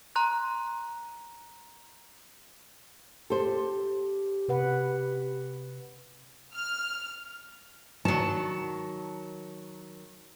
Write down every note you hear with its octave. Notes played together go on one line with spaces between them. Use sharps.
A#5 C6 F#6
G4 A4 C5
C3 B4 F#5
F6
D#3 F#3 A5